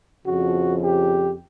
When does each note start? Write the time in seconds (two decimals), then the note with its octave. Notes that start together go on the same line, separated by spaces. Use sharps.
0.25 F2 C#3 F3 F#4
0.81 G4